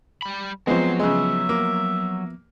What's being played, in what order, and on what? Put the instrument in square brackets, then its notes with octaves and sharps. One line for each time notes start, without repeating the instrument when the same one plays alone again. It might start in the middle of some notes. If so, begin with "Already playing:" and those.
[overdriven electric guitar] G3 B5
[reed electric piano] F3 B3 [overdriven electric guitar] F#3 [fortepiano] G#3 C4 [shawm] C6
[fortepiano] C#3 G#3 [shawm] E5
[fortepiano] A#3